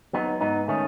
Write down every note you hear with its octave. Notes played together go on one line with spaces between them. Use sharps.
F#3 B3 D#4
G#2 B3 D#4
D#3 A3 C#4